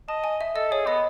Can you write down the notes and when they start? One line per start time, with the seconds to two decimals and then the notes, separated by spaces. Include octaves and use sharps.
0.08 D#5 A5
0.24 G#5
0.41 E5
0.55 A4 D#5
0.71 G#4 C#5
0.87 B3 D#5